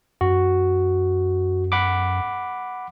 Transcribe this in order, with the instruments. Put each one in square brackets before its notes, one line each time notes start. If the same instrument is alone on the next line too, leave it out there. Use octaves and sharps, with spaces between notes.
[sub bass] F#2 [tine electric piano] F#4
[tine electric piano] F#5 B5 D6